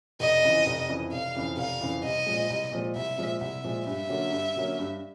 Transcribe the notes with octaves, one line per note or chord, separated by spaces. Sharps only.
F1 D#5
F2 C#3 E3
F1
F2 C#3 E3
F1 F5
F2 C#3 E3
F1 F5
F2 C#3 E3
C2 D#5
A#2 F3 G#3
C2
A#2 F3 G#3
C2 E5
A#2 F3 G#3
C2 E5
A#2 F3 G#3
G2 E5
D3 F#3 A#3 C#4
G2
D3 F#3 A#3 C#4
G2